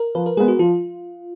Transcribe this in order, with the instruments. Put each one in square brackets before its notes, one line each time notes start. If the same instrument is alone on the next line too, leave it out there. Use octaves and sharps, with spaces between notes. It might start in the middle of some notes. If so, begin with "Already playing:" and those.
Already playing: [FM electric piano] A#4
[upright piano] F3 [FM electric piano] B4
[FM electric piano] A#4
[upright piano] G#3 B3 [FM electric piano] G#4
[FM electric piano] F#4
[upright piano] F3 [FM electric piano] F4